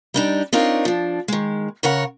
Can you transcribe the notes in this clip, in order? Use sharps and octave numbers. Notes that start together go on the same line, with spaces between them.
G3 D4 D#4
C4 D4 D#4 F4 A#4 C#5
F3 D4
D#3 G#3
C#3 A#4 C#5 F#5